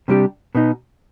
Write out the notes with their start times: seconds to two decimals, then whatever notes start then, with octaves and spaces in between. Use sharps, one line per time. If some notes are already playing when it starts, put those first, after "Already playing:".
0.08 C3 G3 D4 G4
0.55 B2 B3 D#4